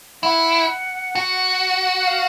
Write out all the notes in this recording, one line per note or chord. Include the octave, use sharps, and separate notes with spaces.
E4 F#5
F#4
F#5
F5